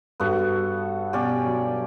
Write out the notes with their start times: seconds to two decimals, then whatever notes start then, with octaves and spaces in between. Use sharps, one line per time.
0.20 G2 B3 F#4 A4
1.13 B2 C#4 G4 D5
1.45 F#3